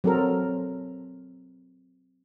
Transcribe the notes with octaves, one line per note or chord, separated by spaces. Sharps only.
F#3 C4 A4 A#4